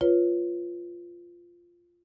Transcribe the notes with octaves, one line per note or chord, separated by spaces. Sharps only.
F4 B4 C#5